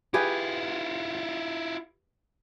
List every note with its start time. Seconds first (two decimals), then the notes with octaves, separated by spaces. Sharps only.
0.14 E4 F4 G4 G#4 B4